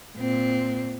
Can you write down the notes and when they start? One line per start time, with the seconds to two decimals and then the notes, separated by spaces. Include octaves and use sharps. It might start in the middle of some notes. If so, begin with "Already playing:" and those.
0.18 A#2 C4